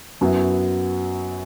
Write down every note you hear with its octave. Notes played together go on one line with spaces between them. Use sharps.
F#2 F#3 B3 E4